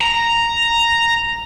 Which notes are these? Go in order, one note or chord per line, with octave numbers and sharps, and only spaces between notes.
A#5